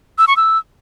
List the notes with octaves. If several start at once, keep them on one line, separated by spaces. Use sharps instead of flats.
E6
C#6
E6